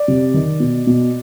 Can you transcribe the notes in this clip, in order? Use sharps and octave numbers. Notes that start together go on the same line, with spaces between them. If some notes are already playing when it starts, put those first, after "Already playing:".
Already playing: D5
C3
D#3
B2
B2